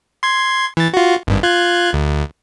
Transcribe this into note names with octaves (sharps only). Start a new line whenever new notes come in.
C6 G#6
E3 A6
F4 F#4
G#1 G2
F4 F#6 G#6
D2